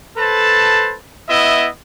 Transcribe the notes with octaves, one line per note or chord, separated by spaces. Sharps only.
A4 B4 C5 A5
B3 E4 D#5 E5